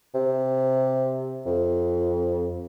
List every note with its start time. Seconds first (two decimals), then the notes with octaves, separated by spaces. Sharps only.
0.14 C3
1.46 F2